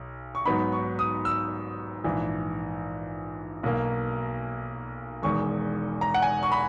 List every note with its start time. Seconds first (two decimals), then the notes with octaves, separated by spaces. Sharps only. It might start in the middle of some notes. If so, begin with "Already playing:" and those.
Already playing: B1
0.35 C#6
0.45 G#2 F#3 B3 D#4 B5
0.72 C#6
0.99 D#6
1.25 E6
2.04 A#1 G#2 E3
3.63 B1 B2 A#3
5.22 E1 E2 D#3 G#3 C#6
6.01 A#5
6.14 F#5
6.22 G#5
6.43 C#6
6.52 B5